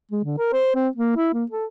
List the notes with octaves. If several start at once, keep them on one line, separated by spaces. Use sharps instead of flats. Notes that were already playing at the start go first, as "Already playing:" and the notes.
G#3
D3
A#4
C5
C4
A#3
E4
A#3
A4